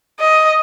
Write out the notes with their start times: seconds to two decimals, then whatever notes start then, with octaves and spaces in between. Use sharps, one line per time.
0.20 D#5